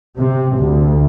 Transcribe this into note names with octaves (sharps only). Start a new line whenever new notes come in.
C3
D2